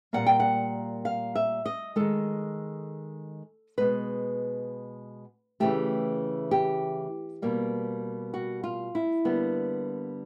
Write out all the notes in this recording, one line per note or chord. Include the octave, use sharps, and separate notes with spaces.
A#2 G3 A#3 F#5
G5
F#5
F5
E5
D#5
D#3 G#3 A4
B2 G#3 B4
C#3 E3 A3 G4
G4
B2 G3 A#3
F#4
F4
E4
D3 G3 A#3 B3